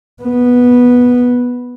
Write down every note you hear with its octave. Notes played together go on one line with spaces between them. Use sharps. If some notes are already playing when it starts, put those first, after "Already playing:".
B3